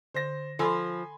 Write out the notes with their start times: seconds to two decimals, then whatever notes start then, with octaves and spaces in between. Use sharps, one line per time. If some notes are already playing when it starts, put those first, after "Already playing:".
0.15 D3 C5 A#6
0.59 F3 A4 G#5 B5 C6 E6